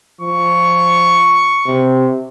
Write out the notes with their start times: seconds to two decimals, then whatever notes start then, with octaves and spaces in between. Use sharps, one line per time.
0.21 F3 C#6
1.67 C3